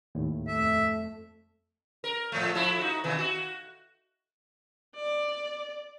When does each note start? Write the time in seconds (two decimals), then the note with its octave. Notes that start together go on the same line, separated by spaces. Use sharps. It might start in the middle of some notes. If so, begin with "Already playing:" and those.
0.15 D#2 A2
0.48 F2 A3 E5
2.04 A#4
2.32 A2 F3 A3
2.55 F3 E4 A4
2.79 D#4 F#4
3.04 B2 D#3 E3
3.19 F#4
4.96 D5